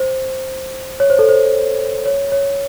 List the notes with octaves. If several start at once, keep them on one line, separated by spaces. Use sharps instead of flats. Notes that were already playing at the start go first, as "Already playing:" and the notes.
Already playing: C5
C#5
C5
A4
C5
C#5
C#5